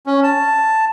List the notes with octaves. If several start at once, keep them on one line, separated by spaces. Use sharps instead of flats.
C#4
A5